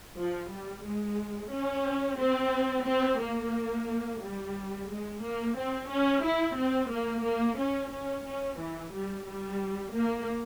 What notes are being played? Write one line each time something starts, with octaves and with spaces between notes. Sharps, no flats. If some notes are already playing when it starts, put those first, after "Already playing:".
F3
G3
G#3
C#4
C4
C4
A#3
G3
G#3
A#3
C4
C#4
E4
C4
A#3
A#3
C#4
C#4
C#4
E3
G3
G3
A#3